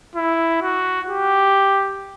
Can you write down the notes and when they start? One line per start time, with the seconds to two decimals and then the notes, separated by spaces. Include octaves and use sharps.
0.15 E4
0.62 F#4
1.08 G4